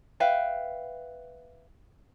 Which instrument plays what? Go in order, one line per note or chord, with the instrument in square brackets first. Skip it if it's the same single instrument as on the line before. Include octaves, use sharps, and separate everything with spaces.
[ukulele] B4 E5 F5 G5